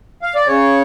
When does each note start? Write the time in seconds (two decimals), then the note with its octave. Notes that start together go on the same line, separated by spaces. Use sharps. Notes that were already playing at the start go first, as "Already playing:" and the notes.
0.22 F5
0.35 D5
0.47 C#3 C#5